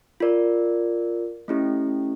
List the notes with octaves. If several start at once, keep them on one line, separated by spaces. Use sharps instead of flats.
F4 A#4 D5
A3 C#4 E4 G4